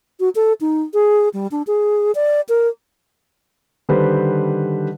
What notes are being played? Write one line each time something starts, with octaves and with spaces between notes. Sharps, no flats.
F#4
A4
D#4
G#4
G3
D4
G#4
D5
A#4
D3 D#3 G3 B4 C5